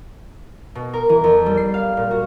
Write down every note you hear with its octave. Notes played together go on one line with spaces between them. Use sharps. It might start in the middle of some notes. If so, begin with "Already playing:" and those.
B2
A#4
E3
F2
G3
C7
F5
A#2
F#4